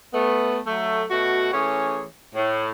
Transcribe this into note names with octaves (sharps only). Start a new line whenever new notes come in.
A3 B3
F#3 A3
B2 A3 F#4
E3 A3 C#4 G#4 C#5
A2